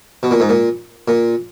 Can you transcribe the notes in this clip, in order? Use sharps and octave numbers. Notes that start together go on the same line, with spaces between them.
B2
A#2
G#2
A#2
A#2